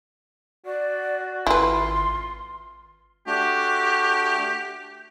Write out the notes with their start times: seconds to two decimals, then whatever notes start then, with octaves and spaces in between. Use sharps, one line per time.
0.66 F#4 D5
1.47 G#1 E4 F4 B4 C6
3.27 A3 D4 F#4 G4